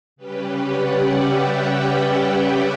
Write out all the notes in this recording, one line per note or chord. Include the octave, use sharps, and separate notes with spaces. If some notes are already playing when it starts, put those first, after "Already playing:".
C#3 G3 C#4 G4 B4
D5 F#5
E5 G5